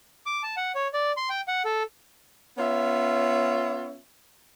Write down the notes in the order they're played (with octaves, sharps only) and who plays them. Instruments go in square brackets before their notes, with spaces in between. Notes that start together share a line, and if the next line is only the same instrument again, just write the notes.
[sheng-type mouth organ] D6
A5
F#5
C#5
D5
C6
G5
F#5
A4
[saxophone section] B3 C#4 F4 C#5 E5